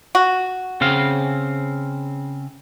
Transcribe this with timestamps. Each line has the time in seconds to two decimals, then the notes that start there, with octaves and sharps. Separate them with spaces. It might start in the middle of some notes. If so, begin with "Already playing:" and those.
0.15 F#4
0.81 C#3 C4 F5